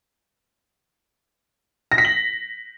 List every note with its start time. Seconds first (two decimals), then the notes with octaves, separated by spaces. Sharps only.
1.92 A#6
1.98 B6
2.05 F#7